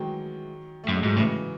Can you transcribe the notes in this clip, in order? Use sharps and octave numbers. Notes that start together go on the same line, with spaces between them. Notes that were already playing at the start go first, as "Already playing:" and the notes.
Already playing: D#3 E3 F#3 G#3
A3
F#2
G#3
G#2 F#3
A2 C#3 E3